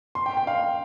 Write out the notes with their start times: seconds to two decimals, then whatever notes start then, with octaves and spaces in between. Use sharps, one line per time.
0.15 C6
0.26 G5
0.37 G5
0.47 F5